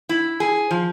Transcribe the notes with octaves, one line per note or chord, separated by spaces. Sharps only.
E4
G#4
F3